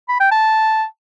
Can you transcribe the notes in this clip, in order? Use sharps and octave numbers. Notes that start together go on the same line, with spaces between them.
B5
G5
A5